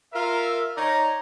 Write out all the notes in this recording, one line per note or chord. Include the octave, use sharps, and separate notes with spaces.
F4 A#4 E5
D#4 C#5 D5 A#5